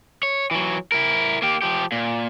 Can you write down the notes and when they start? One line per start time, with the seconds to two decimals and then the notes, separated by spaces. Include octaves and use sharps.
0.23 C#5
0.51 E3 F#3
0.92 E4 A#4
1.42 A#3 G4
1.62 F3 G4
1.92 A#2